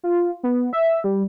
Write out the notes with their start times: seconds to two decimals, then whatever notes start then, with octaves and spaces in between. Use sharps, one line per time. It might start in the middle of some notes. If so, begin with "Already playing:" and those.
0.03 F4
0.43 B3
0.73 E5
1.04 G3